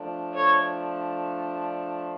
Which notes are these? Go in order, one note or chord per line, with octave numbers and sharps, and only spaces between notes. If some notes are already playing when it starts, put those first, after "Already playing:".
Already playing: F3 A3 D4
A4 C#5